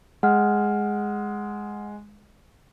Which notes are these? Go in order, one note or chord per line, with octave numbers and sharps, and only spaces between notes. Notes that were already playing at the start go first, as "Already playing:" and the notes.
G#3 F#5 F6